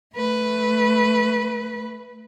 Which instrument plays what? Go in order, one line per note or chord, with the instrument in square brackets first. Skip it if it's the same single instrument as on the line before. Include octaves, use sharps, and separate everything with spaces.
[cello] A3 B4